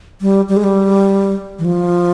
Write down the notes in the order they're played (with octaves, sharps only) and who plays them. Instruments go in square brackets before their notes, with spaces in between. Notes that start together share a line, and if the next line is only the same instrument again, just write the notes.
[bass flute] G3
G3
G#3
G3
E3
F3